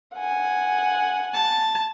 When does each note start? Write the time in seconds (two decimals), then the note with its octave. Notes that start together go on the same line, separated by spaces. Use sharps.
0.15 F#5 G#5
1.34 A5